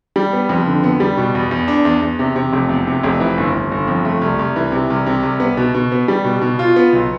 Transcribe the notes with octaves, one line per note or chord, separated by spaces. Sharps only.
G3
B3
F2
D3
B3
G3
B2
E2
E2
D4
E2
E2
C3
C3
F1
E2
C3
F1
E3
G1
G1
G1
F2
A3
C2
C2
E3
C3
C2
C3
C2
B3
B2
B2
B3
G3
B2
B2
F4
B3
B1